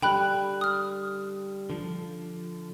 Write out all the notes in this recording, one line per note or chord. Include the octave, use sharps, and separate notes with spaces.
D3 G3 G5 B5 F#6
D#6 F6
D3 F3